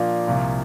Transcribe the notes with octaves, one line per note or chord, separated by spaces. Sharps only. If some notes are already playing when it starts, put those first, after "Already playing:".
Already playing: A#2 F3 A#3 D4
C2 A#2 F3